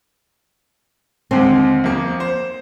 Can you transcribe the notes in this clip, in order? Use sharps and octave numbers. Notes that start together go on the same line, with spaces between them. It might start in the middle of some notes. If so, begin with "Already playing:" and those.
D#2 D3 G#3 C4
F2 A#3
C5